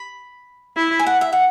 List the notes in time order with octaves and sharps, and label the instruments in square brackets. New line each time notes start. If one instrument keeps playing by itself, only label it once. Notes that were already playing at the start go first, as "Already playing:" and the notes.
Already playing: [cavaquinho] B5
[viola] E4
[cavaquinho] G#5
F#5
E5
F#5